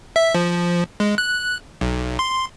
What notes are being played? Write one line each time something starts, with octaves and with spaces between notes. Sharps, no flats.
E5
F3
G#3
F#6
B1
C6